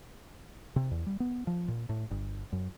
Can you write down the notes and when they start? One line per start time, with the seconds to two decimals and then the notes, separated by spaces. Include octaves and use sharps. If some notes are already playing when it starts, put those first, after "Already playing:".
0.76 C3
0.91 E2
1.06 G3
1.20 B3
1.47 F3
1.68 A#2
1.89 A2
2.11 G1
2.53 F#2